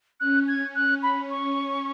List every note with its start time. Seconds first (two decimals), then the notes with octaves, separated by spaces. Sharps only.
0.20 C#4 F#6
0.48 G#6
0.75 F#6
1.03 B5
1.30 C#4 C#6